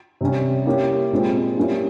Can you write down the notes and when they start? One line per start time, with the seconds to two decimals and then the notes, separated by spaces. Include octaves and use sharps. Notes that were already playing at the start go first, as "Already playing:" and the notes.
0.21 C3 G3 C#4
0.66 A#3 E4 G4 C#5
1.12 A#2 G#3 C4
1.57 G3 A#3 C#4 E4